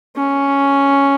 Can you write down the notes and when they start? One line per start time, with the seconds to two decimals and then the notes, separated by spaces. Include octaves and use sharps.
0.16 C#4